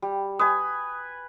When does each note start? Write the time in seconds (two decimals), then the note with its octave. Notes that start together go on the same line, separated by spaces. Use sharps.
0.02 G3
0.40 B4 G#5 D#6